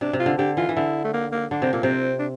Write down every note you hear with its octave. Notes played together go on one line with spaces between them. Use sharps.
C3 D4
C3
F4
D3
D3 G4
E3 F4
E3
D3 E4
A3
A#3
A#3
D3 D4
C3 C4
A#2 A#3
C3 C4
D4